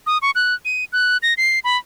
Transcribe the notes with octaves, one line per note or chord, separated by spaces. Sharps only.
D#6
C#6
F#6
D#7
F#6
A#6
C7
B5